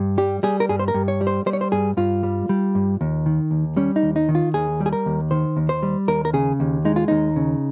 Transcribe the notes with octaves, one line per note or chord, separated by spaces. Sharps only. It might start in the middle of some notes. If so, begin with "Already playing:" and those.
Already playing: G2
G3 G4
G3 G#4
A#4
G2 G#4
C5
A#4
G2
C#5
G3
C5
G3 C5
C#5
C5
G2 G#4
G2 F4
G3
G3
G2
D#2
D#3
D#2
G3 C#4
D#4
D#2
D#4
D#3
F4
D#2 G#4
G3
G#4
A#4
D#2
D#3 C5
D#2
C5
G3
D#2 A#4
A#4
C#3 G#4
D#2
G#3 D#4
F4
D#2 D#4
C#3